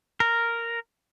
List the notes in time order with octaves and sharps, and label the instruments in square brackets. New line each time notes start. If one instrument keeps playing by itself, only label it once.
[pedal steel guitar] A#4